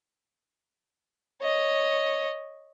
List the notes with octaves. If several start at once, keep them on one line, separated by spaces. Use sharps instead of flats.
C#5 D#5